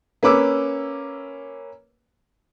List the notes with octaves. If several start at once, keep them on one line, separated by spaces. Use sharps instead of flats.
A#3 C#4 B4 D6 E6